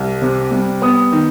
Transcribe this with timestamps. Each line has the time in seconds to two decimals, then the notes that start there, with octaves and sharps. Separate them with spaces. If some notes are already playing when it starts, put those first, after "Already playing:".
Already playing: C2
0.22 C3
0.51 G3
0.82 B3 D#6
1.12 D#3